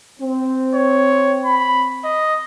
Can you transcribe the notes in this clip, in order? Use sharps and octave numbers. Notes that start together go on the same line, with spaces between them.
C4
C#5
B5
D#5